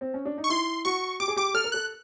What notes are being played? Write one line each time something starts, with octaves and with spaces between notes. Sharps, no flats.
C4
C#4
D4
D#4
C#6
E4 C6
F#4 C#6
G4 D6
G#4
G4 D6
A4 F6
A#4
A4 F#6